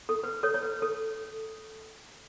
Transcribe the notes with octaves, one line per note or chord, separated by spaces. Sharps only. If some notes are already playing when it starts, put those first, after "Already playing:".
A4
B4
A4 C#5
C#5
B4
A4